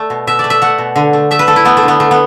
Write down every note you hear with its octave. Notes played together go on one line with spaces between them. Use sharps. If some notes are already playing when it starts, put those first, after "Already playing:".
Already playing: A3 D5
B2
B2 E5
D5
A3
E5
A3 F#5
B2
D3
A3
A3 E5
B4
A3 A4
E4
A3 B3
A3
D3
B3
D3 A3
B3